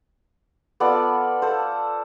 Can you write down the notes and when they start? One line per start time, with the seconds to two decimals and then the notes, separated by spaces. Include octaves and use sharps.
0.80 B3 F4 A4 D5
1.42 A4 C5